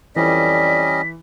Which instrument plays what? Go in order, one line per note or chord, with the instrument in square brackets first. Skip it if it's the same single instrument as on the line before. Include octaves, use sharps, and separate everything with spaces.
[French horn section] F2 D5 [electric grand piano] E3 [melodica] G3 C#4 D#5 [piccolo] B6